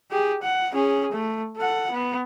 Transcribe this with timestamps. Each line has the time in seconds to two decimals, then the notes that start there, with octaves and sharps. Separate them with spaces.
0.11 G4 G#4
0.42 F#5
0.72 C#4 G#4
1.12 A3
1.57 A4 F#5
1.91 B3